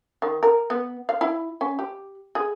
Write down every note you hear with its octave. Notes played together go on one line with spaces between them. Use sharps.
D#3
A#4
B3
F5
E4
C#4
G4
G#4